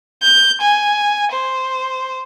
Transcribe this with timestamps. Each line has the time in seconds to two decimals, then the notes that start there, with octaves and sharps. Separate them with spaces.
0.23 G6
0.61 G#5
1.32 C5